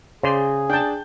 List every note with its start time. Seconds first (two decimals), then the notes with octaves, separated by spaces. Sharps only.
0.23 C#3 G#4 C5 D5 C6
0.70 D4 G5 A5 G6